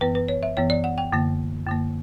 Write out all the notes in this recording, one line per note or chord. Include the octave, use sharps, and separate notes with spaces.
F#2 E3 B3 B4
B4
C#5
E5
F#2 E3 B3 C#5
D5
F#5
G5
F#2 D3 A#3
F#2 D3 A#3